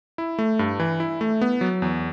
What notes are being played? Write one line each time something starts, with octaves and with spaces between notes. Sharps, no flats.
E4
A3
G2
E3
E4
A3
B3
F#3
E2